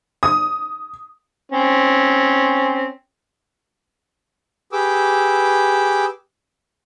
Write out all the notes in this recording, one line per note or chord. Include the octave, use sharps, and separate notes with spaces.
D#6
C4 C#4
G4 G#4 B4 D6 E6